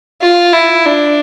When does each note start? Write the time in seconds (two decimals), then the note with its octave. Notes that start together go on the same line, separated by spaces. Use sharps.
0.22 F4
0.53 E4
0.85 D4